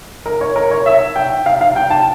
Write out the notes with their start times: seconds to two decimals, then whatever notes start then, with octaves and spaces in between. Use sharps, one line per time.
0.26 A#4
0.41 C#5
0.56 A#4
0.71 C#5
0.86 E5
1.16 G5
1.46 F5
1.61 F5
1.76 G5
1.90 A5